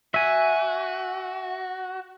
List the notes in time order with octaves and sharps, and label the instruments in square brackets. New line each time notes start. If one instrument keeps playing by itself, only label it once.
[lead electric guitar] F#4 [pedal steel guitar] E5 G#5